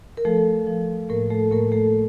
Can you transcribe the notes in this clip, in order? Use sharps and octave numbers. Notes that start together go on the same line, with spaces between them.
A#4
F3 A3 A4
F3
A2 A#3 A#4
A3 A4
A2 A#3 A#4
A3 A4